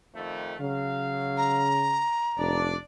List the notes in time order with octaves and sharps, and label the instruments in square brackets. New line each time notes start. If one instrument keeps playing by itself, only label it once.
[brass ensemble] F2 D#3 A3
[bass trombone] C#3 [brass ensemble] F#3 F5
[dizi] A#5
[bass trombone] F1 [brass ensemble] D4 D5